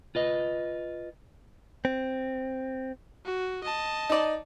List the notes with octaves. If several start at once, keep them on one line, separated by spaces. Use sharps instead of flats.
F4 B4 D#5
C4
F#4
D#5 A5
D#4 D5